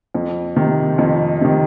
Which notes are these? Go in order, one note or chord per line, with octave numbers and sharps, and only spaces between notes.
F2
C3 D#3
F2
C3 D#3